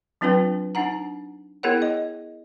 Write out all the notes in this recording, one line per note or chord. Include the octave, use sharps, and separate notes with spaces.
F#3 C4 D4 F4 B4 G5
D4 D#4 F#5 A#5
B3 E4 G#4 A#4 C#5 F#5
D#5